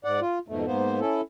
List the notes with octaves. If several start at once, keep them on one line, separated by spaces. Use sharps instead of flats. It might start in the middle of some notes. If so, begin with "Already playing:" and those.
G#2 D5 F#5
F4
F2 G#2 B2 A3
G#2 A#3 B3 C5
C#4 E4 A4